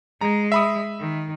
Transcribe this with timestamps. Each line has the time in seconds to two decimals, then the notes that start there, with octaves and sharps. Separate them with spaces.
0.21 G#3 A#5
0.52 E5 B5 D#6
1.00 D#3